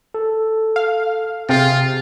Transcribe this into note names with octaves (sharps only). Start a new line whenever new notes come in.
A4
F5
C3 F4 G#4 F5 G5